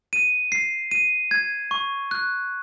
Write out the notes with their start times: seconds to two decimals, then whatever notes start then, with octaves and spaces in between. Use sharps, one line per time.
0.13 D#7
0.52 C7
0.91 D#7
1.31 G#6
1.71 C#6
2.11 F#6